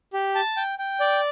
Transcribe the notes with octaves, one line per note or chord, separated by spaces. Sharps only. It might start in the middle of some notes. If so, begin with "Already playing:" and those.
G4
A5
G5
G5
D5